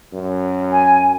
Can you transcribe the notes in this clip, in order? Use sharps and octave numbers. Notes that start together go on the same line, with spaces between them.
F#2
G#5